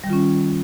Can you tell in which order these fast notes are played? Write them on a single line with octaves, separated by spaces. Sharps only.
G3 D#3 F4 C#4